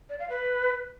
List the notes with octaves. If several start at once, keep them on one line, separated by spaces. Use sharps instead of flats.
D5
F5
B4